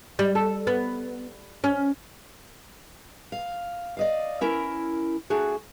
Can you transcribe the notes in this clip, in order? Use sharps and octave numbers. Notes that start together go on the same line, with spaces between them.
G3
A4
B3
C#4
F5
D5 D#5 F5
C#4 E4 A#4
A3 D4 F#4 G#4